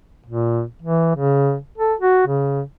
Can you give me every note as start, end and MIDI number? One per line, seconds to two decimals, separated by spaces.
0.27 0.63 46
0.82 1.14 52
1.16 1.56 49
1.78 1.94 69
2.00 2.25 66
2.27 2.62 49